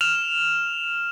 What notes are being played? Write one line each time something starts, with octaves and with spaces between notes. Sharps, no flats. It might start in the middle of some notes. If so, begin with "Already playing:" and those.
F6 E7 F7